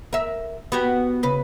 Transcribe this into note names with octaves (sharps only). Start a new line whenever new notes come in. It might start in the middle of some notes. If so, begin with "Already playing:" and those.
A#4 E5
B3 F#4 G4
C#3 B4